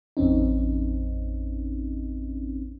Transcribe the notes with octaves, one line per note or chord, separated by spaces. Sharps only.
A1 F2 C4 C#4 D#4